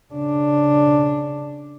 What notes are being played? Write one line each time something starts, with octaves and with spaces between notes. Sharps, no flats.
C#3 D4